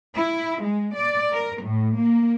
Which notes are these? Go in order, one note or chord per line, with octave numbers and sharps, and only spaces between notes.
E4
G#3
D5
A#4
A2
A#3